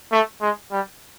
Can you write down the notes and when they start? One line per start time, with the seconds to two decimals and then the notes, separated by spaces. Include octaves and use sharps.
0.12 A3
0.41 G#3
0.71 G3